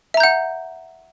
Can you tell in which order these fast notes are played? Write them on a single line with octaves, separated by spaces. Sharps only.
E5 A#5 G6 F#5